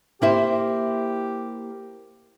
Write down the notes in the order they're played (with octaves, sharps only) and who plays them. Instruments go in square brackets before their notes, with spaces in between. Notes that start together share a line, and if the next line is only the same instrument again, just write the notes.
[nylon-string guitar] A#3 E4 C5 [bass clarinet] G4